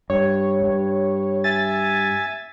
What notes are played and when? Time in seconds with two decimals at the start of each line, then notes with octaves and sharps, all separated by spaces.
0.10 G2 C#5
0.63 G2
1.44 E5 G#5 A6